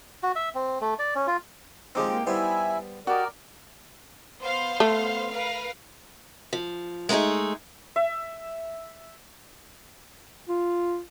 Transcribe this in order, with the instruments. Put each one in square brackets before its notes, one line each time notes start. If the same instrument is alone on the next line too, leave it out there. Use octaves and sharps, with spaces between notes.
[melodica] F#4
E5
C4
A3
D5
C#4
F4
[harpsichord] F3 G#3 C4 [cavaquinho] D#4 G4 F5
[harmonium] A#3 G5
[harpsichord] G3 B3 C5 [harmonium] E4 E5 G#5
[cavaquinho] F#4 G4 D#5 [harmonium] A#4 D5
[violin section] B3 C5 F5
[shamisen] A3
[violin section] A#4 B4 F5
[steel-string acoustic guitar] F3
G#3 A3 D4 D#4 G#4
[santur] E5
[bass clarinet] F4